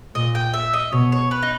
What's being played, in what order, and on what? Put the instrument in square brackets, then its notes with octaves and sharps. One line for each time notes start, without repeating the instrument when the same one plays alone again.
[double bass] A#2 [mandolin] D#5
[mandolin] G5
E5
D#5
[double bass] B2 [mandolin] C#5
[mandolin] C#5
B4
D#4